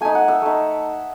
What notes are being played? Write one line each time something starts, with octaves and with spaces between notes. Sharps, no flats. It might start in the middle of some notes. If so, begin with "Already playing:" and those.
A3 D#4 G#5
F#5
E5
A3 D#4